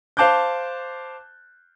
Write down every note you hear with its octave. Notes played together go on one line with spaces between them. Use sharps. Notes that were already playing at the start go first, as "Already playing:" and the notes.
C5 F5 A5 D6 F#6 G6